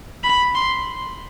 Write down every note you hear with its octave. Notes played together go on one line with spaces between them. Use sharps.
B5
C6